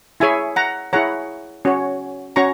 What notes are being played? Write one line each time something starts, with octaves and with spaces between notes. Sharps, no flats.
E4 G#4 C#5 E5 G#5
F#5 A#5
E4 G#4 C#5 F#5 A#5
C#4 F#4 C#5
C#4 F#4 C#5 A#5 C#6